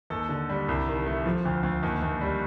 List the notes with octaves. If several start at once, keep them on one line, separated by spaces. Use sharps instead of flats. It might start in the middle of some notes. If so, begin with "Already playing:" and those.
D#2 A4
D3
G3
C2
D#3
A3
F3
D2
D2
D#2
D#2
G3